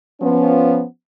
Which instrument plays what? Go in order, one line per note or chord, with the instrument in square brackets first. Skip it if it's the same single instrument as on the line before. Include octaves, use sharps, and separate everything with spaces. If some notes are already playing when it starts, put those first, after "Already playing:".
[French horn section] F3 B3 C#4